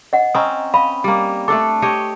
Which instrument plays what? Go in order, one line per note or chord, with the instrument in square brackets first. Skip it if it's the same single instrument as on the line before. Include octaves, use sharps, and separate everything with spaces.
[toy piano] D#5 F#5
[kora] C4 C#4 [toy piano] D#5 A#5 D#6
[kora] D#5 [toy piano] F5 B5
[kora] G3 A#3
[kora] A3 D4 A4 [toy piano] D6
[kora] G4 C#5 D#5